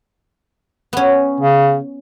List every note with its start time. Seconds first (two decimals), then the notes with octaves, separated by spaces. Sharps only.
0.93 B3 C#4
1.40 C#3